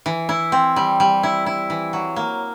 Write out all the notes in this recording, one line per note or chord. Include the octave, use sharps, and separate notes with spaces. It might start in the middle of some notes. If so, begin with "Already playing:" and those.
E3
E4
C4
G3
G3
E4
E4
E3
F#3
A#3